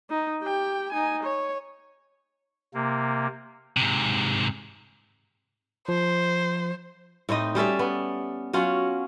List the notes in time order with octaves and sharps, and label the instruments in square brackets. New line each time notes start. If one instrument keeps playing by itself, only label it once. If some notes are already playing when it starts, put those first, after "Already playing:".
[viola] D#4
G4 G5
D#4 G#5
C#5
[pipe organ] C3 A#3
[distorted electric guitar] G#2 C3
[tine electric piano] F3 [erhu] C5
[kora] A2 C4 D#4 D#5
G3 C#4 A4 E5
B3
F#3 C#4 F4 F#5